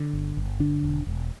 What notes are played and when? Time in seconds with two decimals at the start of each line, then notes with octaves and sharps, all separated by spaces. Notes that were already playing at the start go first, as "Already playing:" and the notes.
Already playing: D3
0.13 G1
0.37 G1
0.60 D3 D4
0.83 E1
1.07 E1